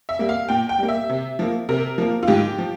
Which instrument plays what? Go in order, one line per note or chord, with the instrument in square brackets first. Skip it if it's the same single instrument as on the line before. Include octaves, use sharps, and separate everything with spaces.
[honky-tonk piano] E5
G3 A#3
F5
A#2 G5
G5
G3 A#3
E5
C3
F3 A#3
C3 A#4
F3 A#3
F4
G#2 G4
F3